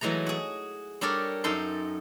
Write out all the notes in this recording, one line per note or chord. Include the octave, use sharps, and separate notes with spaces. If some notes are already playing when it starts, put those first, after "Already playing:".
E3 F#3 G#3 A3 A#5
F#4 G#4
G3 D4 A4 A#4 C#5 D5
F#2 D#4 A4 G5 C6